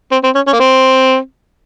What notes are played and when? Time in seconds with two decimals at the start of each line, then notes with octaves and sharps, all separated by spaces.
0.12 C4
0.24 C4
0.35 C#4
0.47 C#4
0.53 A#3
0.60 C4